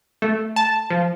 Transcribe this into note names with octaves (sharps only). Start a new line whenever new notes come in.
A3
A5
F3